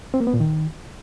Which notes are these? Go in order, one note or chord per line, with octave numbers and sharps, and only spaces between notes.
C4
A#3
B3
A#2
D#3